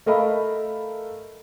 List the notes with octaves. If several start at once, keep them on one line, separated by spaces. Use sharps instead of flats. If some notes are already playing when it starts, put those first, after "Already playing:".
A3 A#4 D#5 F5 B5